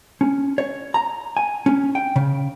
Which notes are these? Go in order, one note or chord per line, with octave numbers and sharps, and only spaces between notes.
C#4
C#5
A#5
G#5
C#4
G5
C#3